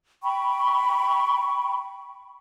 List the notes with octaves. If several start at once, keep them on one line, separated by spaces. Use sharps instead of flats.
G5 B5 C#6